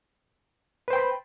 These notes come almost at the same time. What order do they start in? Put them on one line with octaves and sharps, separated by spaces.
B4 C5 G5 C6 B5